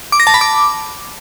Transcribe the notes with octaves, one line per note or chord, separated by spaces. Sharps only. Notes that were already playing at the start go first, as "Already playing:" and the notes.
D6
A#6
A5
B5
D6